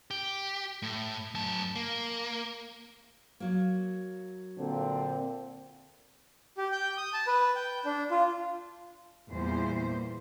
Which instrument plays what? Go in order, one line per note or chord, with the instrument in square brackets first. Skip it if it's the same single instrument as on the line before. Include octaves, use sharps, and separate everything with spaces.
[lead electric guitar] G4
A2
F#2 A5
A#3
[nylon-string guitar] F#3 A#3
[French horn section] A#2 D3 C4
[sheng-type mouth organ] G4
G5
D#6
A5
B4
G5
D4
F4
[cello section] E2 A#2 G3 C5